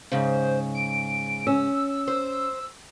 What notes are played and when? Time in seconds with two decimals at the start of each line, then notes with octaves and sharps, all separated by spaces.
0.12 G#2 C#3 C5
0.75 D7
1.47 C#4 E6
2.08 C5